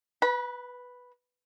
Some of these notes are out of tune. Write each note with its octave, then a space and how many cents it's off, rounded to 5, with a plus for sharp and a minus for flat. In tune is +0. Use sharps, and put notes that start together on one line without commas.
B4 +0 B5 -35